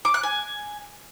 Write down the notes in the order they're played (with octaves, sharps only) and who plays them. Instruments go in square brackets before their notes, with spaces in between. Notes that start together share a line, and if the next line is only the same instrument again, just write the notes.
[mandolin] D6
F#6
G#5